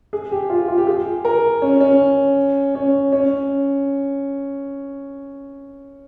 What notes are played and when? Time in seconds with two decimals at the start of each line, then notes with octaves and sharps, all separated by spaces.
0.13 G#4
0.32 G4
0.50 F4
0.68 F4
0.78 G4
0.87 G#4
1.25 A#4
1.62 C#4
1.80 C#4
2.75 C#4
3.12 C#4